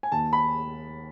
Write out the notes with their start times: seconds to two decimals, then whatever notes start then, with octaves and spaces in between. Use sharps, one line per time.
0.03 G#5
0.12 D#2 A5
0.33 B5